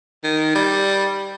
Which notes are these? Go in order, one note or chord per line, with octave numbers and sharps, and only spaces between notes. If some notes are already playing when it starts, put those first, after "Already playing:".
D#3
G3